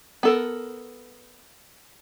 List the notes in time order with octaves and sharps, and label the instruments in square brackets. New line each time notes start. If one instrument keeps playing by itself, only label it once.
[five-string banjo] B3 A4 A#4